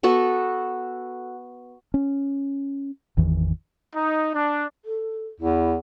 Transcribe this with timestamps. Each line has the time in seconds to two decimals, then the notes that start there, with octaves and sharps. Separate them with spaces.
0.03 B3 F#4 A4
1.94 C#4
3.17 G#1 E2 D#3 E3
3.96 D#4
4.35 D4
4.85 A4
5.40 E2 E4